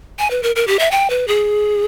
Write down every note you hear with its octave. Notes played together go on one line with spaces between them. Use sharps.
G#5
B4
A#4
A#4
G4
E5
G5
B4
G#4